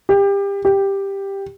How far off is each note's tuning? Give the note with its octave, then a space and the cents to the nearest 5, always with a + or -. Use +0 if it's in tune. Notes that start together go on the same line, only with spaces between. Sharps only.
G4 +25
G4 +5